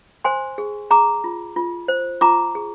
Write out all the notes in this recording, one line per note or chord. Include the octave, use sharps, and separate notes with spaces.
C5 G#5 C6
G#4
G#4 A#5 D6
F4
F4
C5
F4 A#5 D6
G#4